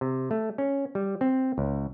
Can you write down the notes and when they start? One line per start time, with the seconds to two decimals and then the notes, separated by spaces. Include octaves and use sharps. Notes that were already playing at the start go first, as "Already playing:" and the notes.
0.01 C3
0.31 A3
0.58 C#4
0.95 G3
1.21 C4
1.58 C#2